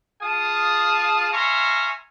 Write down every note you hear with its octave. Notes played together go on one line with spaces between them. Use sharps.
F4 G#4 F5 A5 D#6
E5 F5 G#5 A#5 C6 C#6